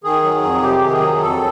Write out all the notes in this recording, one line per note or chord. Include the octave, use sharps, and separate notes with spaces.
D#3 G#4
F#3
F2
C3 G4
D#3
G#4
F#3
F2 A4